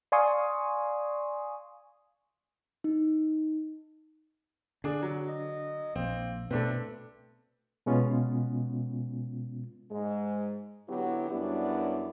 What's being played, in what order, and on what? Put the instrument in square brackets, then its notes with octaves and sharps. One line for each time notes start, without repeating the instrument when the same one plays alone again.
[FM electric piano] D5 F5 G#5 C6 C#6 D#6
[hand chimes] D#4
[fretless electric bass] D3 [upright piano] D4 G#4
[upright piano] F#3
[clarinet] D#5
[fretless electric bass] A#1 [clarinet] A#3 [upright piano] C4
[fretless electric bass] B2 A3 [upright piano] C4 D4 A4 [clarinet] B4
[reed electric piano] B2 G#3 B3 C#4 F4
[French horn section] G#2 G#3
D3 F#3 B3 E4 G4
F#2 F#3 G3 B3 D4 E4